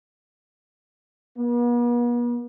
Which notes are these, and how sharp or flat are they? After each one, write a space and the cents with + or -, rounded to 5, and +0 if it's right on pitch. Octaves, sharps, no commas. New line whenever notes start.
B3 -45